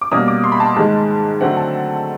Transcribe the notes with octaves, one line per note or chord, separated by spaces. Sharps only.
D6
B2 G3 A#3 C#4 D#6
D6
C6
B5
A5
G#2 D#3 G#3 A5
D3 F#3 A3 C4 F#5
A5